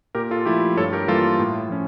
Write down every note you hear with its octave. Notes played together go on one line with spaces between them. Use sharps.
A#2 G4 A#4
F4 A4
F3 A3 E4 G4
G2 A4 C#5
G4 A#4
E3 G3 A#3 F4 A4
A2
F3 C#4